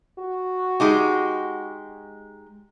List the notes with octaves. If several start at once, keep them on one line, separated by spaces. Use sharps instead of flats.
F#4
G#3 D#4 G4